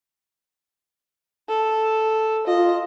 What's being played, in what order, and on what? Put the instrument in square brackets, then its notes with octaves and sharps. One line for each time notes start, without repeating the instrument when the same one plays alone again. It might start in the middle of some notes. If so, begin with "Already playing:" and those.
[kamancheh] A4
[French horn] F4 [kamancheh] D#5